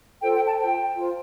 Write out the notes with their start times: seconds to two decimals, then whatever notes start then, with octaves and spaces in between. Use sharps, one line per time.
0.22 F4 A4 C5 G5
0.35 G5
0.46 A5
0.59 F4 C5 G5
0.95 F4 C5